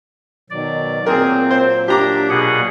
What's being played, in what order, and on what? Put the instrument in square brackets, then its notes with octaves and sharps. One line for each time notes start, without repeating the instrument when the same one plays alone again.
[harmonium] B2 D#3 F#3 [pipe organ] D5
[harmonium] A#2 F#3 A#3 [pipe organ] C4 [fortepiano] G#4 A#4
[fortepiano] C5
[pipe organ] D4 [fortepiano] G4 A#5 D6
[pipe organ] B2 G#4 F#5